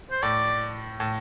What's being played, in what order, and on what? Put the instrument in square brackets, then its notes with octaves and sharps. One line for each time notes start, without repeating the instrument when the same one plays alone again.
[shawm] C5
[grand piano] A2 [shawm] D5
[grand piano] A2